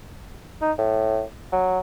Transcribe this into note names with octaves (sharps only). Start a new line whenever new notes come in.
D#4
A2
F#3